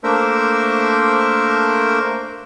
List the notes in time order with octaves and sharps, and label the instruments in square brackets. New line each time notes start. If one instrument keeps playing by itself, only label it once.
[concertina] A3 A#3 D4 A#4 C5 E5